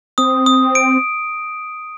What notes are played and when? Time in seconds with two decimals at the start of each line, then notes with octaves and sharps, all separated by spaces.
0.18 C4 D#6
0.46 D#6
0.75 D7